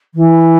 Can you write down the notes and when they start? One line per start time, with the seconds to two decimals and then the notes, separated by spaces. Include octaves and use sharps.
0.15 E3